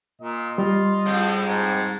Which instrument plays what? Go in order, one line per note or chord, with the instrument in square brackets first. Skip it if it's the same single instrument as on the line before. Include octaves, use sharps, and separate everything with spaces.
[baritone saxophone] A#2 [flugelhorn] D#5
[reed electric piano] G3 [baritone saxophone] F4
[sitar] F2 A2 G#3
[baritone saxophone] G#2